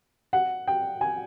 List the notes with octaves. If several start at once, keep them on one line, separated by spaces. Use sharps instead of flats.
F#5
G5
G#5